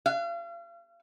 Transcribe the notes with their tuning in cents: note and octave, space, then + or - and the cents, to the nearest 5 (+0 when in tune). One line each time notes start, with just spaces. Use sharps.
F5 -40